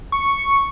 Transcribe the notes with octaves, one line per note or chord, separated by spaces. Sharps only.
C#6